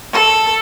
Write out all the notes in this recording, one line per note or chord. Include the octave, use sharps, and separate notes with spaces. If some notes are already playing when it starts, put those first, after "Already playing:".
A4